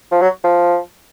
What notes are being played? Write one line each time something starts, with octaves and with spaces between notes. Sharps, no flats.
F3
F#3
F3